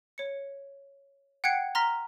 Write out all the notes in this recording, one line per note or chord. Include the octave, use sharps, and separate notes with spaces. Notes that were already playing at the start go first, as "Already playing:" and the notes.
C#5 C#7
F#5 G5 F#6 G#6 C7 C#7
A#5 C6 F6 A#6 B6